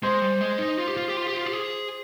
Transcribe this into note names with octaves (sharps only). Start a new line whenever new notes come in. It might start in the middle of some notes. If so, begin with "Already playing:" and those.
G#3 C5
G3
G#3
D#4
F4
G4
F4
G4
F4
G4
F4
G4
G#4